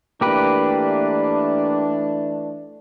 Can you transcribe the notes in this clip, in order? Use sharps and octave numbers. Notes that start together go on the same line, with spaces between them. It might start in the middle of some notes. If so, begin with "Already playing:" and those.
E3 A3 A#3 D4 G4 B4